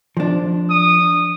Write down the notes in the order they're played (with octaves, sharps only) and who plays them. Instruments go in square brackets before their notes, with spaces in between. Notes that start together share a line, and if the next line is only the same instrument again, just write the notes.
[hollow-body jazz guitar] F3 D4
[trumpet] D#6